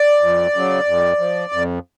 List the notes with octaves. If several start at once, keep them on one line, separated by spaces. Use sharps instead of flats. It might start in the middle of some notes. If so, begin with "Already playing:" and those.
Already playing: D5
F2
C#3 F#3
F2
F3
F2